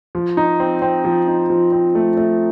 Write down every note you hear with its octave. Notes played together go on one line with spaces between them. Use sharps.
F3
D#4
C4
C4
F3
D#4
F3
C4
A3
A3